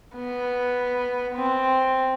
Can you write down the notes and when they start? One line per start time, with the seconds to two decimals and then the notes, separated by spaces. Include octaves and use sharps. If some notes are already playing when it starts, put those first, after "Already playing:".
0.15 B3
1.35 C4